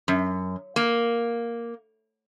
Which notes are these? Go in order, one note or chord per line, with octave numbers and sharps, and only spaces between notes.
F#2
A#3